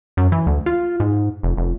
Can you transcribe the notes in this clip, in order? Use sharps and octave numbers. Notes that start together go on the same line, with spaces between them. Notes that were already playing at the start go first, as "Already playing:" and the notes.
F#2
E3
D2
F4
G#2
F1
F1